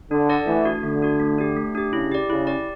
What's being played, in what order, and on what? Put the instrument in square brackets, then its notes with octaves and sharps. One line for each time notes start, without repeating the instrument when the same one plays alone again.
[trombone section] D3 [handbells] D4
[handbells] A4 D5 F#5 A5
[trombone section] E3 [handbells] A3
[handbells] D4 F#4
[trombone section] D3 [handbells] A3
[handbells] D4 F#4
A3
D4 G4
A3
D4 G4
[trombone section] C#3 [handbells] E4
[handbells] G4 D5
[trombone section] C#3 [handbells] E4
[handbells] G4 D5